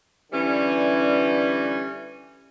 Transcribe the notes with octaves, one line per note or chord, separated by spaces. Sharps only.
D3 E3 G3 C#4